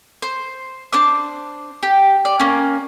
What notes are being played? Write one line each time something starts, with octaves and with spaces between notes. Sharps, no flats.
C5
D4 C5 D6
G4
D5
A#3 C#4